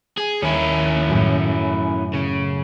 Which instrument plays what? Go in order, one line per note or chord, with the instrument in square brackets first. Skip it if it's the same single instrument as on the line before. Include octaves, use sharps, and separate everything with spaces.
[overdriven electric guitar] G#4
[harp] D#2 [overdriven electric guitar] C#4 E4
[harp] F#2 A2
[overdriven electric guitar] C#3